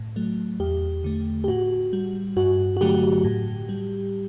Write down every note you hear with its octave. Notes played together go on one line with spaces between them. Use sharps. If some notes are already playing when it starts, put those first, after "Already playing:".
Already playing: A2
F#3 A3
E2 G4
D3 A3
G4
A2 F#4
G3
G2 F#4
F#4
D3 F#3 A3 G4
A2
G3